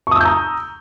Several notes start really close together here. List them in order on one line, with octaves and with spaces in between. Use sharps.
C#6 D#6 E6 G6 A#5